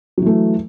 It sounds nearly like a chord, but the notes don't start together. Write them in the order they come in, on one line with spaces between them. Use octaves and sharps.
F#3 E3 A3